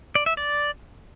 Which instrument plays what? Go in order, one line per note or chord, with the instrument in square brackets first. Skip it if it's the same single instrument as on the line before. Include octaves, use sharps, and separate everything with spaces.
[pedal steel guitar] D5
E5
D5